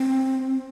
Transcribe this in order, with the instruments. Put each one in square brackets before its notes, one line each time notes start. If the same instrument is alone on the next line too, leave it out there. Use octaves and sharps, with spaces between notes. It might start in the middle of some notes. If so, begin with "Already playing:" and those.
Already playing: [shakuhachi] C4